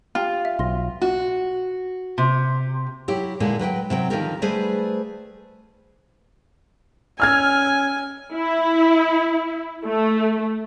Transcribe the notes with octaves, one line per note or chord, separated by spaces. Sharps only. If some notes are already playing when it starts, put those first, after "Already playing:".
F4 G4 G5 A5
E5
B1 C6 A#6
F#4
C3
F#3 E4 G4
A#2 D3 G#3 A#3 E4
F#3 B4 C#5 G5
C3 F#3 G5
D3 D#3 F3 A3 G4 A#4
G3 A3 G#4 B4 C5
C#4 G#5 E6 F6 G#6
E4
A3